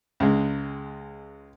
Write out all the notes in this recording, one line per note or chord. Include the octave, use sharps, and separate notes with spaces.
C#2 G#3